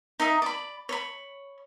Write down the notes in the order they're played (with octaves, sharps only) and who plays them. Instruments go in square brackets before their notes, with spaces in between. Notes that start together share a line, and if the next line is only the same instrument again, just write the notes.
[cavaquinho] D#4 D#5 E5
D5 B5
C#5 B5